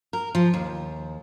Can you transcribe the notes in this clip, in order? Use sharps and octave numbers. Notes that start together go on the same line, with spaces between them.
A#4
F3
D#2